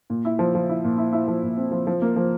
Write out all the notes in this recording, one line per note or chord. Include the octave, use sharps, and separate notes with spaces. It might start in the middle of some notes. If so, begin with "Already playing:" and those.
A#2
E4
F3
F3
E4
A#2
E4
E4
F3
A#2
C4
F3
F3
A#3
F3